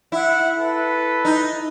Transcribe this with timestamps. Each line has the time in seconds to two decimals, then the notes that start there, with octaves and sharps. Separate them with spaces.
0.12 E4 E5 F#5
0.58 A4 B4
1.25 D#4